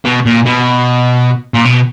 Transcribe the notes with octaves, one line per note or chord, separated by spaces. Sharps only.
B2
A#2
B2
A#2
B2